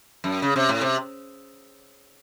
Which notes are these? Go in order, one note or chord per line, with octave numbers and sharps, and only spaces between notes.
F#2
C#3
C3
A2
C3